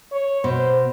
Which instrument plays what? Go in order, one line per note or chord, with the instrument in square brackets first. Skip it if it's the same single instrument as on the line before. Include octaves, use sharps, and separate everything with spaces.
[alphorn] C#5
[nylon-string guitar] B2 [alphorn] C5